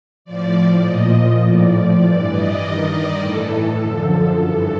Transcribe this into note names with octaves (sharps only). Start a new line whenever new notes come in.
A2 F3 D5
A#2 F3 D#5
A2 F3 D5
G2 E3 D5
D#5
G2 D#3
D5
A2 E3 A4
F#2 D3 F3 A4
G2 E3 A4